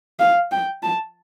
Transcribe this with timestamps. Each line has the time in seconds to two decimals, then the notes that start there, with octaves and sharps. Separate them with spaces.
0.19 F5
0.52 G5
0.83 A5